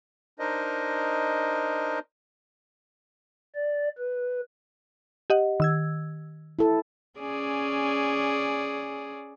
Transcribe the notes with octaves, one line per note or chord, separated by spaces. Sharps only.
D4 D#4 A#4 C5 D#5
D5
B4
G4 D#5 F#5
D#3 E6 G#6
E4 A4
C#4 G#4 D5